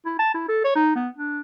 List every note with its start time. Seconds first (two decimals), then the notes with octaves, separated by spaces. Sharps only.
0.06 E4
0.19 A5
0.34 E4
0.49 A4
0.64 C#5
0.76 D#4
0.95 B3
1.17 D4